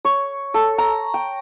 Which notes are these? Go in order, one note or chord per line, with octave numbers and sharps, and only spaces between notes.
C#5
A4
A#5
G5